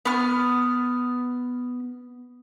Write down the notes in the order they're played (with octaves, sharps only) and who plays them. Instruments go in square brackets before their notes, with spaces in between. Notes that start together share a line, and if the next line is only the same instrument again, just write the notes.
[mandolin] B3 F6